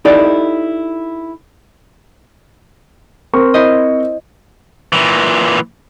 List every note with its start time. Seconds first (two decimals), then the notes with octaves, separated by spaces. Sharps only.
0.05 D#4 E4 G4 A4 D5
3.33 C4 A#4 C#6
3.54 E4 C5 D#5
4.92 A#2 E3